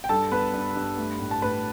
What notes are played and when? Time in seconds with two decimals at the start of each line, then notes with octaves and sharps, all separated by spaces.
0.04 G5
0.09 G2 A4 A5
0.31 B3 B4 B5
0.54 G2
0.76 G2
0.98 A3
1.20 A2
1.31 A5
1.42 A2 B4 B5